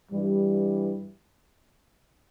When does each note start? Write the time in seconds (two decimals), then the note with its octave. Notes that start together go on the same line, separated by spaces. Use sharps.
0.11 G2 E3 G3